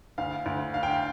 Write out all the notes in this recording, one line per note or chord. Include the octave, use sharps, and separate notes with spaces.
D2 F5
D2
D3 F5
G5
F5